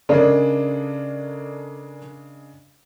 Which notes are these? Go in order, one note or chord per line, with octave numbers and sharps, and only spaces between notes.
C#3 G#3 D4 A4 A#4 D5